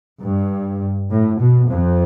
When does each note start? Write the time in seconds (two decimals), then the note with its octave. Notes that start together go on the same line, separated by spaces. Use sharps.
0.21 G2
1.10 A2
1.40 B2
1.69 F2